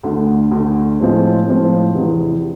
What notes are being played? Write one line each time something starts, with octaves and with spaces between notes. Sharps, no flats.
D2 D3 A3
D2 D3 A3
A2 F3 G#3 C4 F4
A2 F3 G#3 C4 F4
E2 C3 E3